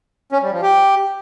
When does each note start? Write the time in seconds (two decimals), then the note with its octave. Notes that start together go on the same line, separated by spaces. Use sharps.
0.32 C#4
0.42 G3
0.52 F3
0.62 G4